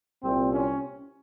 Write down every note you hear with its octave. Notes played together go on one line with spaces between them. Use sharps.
C2 A#2 C4
C#4